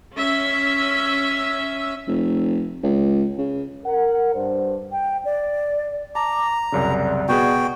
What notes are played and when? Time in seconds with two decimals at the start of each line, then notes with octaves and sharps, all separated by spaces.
0.16 C#4 E5
2.08 F1
2.84 C#2
3.38 C#3
3.86 A#4 F#5
4.35 G2 D4 C5
4.92 G5
5.25 D5
6.15 A5 A#5 D6
6.72 C2 F#2 C#3 D5
7.28 B2 B3 F#4 G#4 G5